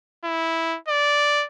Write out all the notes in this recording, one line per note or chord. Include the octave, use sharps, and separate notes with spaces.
E4
D5